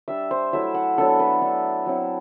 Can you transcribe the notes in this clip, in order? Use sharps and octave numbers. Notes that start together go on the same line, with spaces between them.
G3 D4 E5
C5
F#3 A3 E4 E5
F#5
F#3 B3 D4 A4
B4
A3 D4
F#3 C4 E4